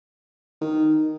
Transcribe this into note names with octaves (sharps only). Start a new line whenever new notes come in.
D#3